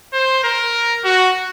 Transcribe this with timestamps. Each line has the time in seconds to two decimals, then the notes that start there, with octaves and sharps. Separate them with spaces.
0.13 C5
0.44 A#4
1.05 F#4